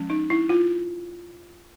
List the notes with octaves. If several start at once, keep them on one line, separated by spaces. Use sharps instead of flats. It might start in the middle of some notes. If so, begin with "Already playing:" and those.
Already playing: F3 G#3 C#4
D#4
E4
F4